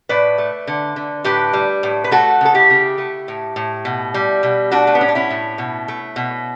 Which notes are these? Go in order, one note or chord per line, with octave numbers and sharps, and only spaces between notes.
A2 B4 D5
A3
D3
D3
A2 G4 B4
G3
A2
B4
A3 F#4 A4
C#3 A4
E4 G4
C#3
A3
A2
A2
B2
G3
B2
A3 D4 F#4
A3
B3
A2 C#4
D4
C#4 E4
A2
B2
A3
B2